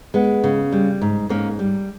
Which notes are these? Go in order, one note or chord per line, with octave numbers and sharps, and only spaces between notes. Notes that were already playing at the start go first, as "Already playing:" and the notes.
G#3 B3
C#3
G3
G#2
G#2 A#3 C#4
G3